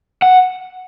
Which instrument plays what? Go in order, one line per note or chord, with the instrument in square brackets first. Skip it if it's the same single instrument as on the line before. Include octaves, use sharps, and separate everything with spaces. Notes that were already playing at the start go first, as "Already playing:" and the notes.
[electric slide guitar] F#5